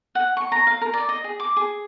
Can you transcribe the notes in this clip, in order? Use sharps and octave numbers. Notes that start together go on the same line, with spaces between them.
F#5
C#6
A#5
F5
A#4
D5
D#5
G#4
D6
G#4